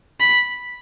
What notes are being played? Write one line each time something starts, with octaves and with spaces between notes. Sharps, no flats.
B5